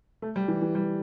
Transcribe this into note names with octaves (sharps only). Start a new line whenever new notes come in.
A3
G3
E3
E3
G3